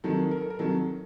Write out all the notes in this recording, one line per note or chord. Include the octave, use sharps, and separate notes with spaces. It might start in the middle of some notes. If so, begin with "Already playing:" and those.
C3 D#3 F#3 A4
A#4
A4
A#4
C3 D#3 F#3 A4